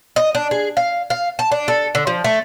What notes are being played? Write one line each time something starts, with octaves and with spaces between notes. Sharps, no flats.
D#5
D4
G#4
F5
F5
A5
D4
A4
D3
F3
A3